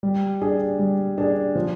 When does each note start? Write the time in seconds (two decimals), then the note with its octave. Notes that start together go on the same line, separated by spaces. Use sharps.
0.03 G3
0.42 D4 G#4
0.79 G3
1.18 D4 G#4
1.56 F3